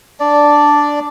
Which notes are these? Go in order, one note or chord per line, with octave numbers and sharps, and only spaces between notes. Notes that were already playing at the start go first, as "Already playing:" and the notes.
D4 D5